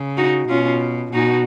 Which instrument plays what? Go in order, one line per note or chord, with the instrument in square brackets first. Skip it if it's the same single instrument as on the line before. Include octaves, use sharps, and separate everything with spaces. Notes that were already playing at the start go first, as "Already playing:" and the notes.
Already playing: [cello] C#3
[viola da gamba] D#4 F#4
[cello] B2 [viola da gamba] C#4 F4
[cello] B2 [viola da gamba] D#4 F#4